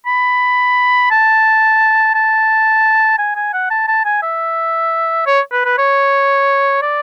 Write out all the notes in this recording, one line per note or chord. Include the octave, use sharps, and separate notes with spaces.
B5
A5
A5
G#5
G#5
F#5
A5
A5
G#5
E5
C#5
B4
B4
C#5
D5